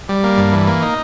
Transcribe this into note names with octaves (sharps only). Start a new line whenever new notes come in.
G3
A#3
G2
E3
A#3
D#4